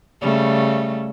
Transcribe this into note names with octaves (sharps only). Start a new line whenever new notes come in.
C#3 G3 A3